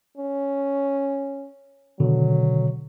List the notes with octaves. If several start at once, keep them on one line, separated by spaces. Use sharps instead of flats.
C#4
B2 D3 D#3 F#3